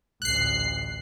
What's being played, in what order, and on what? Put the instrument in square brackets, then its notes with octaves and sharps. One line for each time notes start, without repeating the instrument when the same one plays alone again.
[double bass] A1 D2 [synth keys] F#6 C7